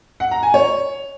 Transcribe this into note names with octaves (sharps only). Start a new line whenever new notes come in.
F#5
A#5
G#5
C#5